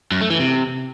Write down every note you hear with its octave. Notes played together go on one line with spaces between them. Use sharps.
F#2
A3
E3
C3